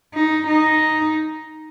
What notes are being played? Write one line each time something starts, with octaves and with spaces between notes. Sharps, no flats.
D#4
D#4